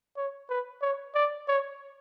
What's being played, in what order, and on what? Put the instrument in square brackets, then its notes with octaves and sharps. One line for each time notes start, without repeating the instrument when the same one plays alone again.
[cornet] C#5
B4
C#5
D5
C#5